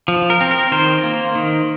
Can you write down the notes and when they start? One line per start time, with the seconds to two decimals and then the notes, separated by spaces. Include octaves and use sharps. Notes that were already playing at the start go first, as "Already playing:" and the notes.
0.08 F3
0.30 A#4
0.41 C4
0.51 A#4
0.72 D#3 C5
1.03 A#3
1.35 D#3